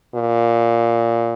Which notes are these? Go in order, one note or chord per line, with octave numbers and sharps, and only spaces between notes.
A#2